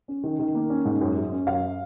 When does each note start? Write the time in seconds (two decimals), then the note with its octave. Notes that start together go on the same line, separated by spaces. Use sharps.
0.08 C#4
0.23 D#3
0.39 D#3
0.55 A#3
0.70 C#4
0.85 G#2
1.01 F#2
1.16 F#2
1.32 C#4
1.47 F#2 F5